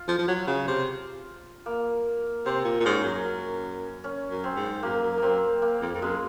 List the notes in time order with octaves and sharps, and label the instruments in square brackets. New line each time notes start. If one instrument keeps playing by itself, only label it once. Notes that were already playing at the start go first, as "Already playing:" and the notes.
Already playing: [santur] F4
[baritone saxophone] F3
F3
F#3
C#3
C3
[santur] A#3
[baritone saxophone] C3 [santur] C4
[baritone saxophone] A#2
A#2
[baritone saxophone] G#2 [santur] C#4
[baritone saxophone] F#2
[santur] C#4
[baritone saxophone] F#2
[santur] C4
[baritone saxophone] G#2
[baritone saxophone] F#2 [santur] A#3
[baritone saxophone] F#2
[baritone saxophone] F#2 [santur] A#3 C4
[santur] A#3
[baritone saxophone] F2
F2
[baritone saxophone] F#2 [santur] G#3